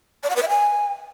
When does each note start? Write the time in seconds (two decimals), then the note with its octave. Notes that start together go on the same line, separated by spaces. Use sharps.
0.23 D5
0.30 F#5
0.36 B4
0.42 E5
0.49 G#5